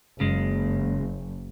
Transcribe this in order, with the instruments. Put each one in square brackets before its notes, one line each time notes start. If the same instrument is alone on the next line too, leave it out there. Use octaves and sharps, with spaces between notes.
[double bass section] F#1 [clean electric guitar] C#3 G#3